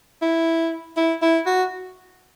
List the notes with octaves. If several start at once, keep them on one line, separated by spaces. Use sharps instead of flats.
E4
E4
E4
F#4